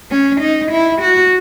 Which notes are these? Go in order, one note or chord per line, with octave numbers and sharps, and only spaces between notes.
C#4
D#4
E4
F#4